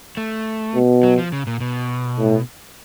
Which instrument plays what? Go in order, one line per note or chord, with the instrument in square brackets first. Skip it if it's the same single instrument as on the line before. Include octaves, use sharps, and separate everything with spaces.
[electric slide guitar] A3
[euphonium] B2
[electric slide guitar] F#3
F3
C#3
A#2
B2
[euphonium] A2